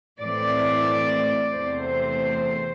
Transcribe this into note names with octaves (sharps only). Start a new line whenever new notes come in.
A2 E3 A3 C4 D5
E2 C3 A3 C4 C5